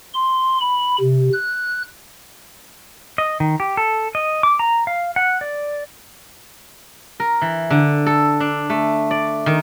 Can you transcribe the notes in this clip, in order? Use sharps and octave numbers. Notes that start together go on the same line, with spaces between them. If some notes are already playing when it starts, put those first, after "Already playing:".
C6
B5
C3
F#6
D#5
D#3
G4
A4
D#5
D6
A#5
F5
F#5
D5
A#4
E3
D3
A4
D4
A3
D5
D#3